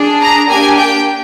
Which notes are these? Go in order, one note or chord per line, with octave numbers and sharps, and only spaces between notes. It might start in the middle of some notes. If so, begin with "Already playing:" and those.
Already playing: D4 G#4
A#5
A#3 D4 G4 G#5
G5